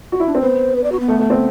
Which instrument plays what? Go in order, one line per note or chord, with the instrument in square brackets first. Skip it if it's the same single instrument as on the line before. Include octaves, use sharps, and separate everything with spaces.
[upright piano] F#4
E4
D4
C4
[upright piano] B3 [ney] C5
[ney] B4
D5
F#4
B3
[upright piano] A3
A3
C4